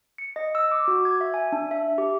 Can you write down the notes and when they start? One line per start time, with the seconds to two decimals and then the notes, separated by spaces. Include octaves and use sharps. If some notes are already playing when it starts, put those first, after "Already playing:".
0.18 C#7
0.36 D#5
0.55 E6
0.72 D6
0.88 F#4
1.05 G#6
1.21 E5
1.34 G#5
1.52 D4
1.71 E5
1.98 G4